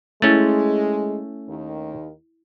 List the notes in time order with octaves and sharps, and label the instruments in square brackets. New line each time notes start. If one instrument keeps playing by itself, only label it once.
[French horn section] G#3 [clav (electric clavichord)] A3 C#4 [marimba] E4 A6
[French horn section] D#2 D#3